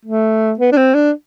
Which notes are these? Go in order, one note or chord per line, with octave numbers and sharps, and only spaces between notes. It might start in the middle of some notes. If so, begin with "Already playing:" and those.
A3
B3
D4
C4
D4